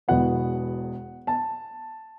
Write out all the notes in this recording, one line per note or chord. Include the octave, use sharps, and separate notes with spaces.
E1 E2 B2 B3 F#5
A5